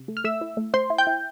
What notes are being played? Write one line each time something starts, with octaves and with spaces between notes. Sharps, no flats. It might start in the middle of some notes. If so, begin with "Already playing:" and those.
Already playing: C3
A3
F6
A3 E5 E6
E4
A3
A3 C5 C6
E4
G5 G6
E4